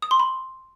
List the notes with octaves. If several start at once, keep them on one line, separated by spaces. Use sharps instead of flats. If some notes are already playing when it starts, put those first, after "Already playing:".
D#6
C6
B5